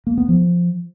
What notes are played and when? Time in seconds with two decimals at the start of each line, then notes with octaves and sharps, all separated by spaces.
0.07 A#3
0.17 B3
0.28 F3